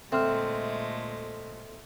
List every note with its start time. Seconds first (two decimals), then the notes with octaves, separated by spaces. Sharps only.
0.12 A#2 D3 G#3 A3 C4 E5 C6 F6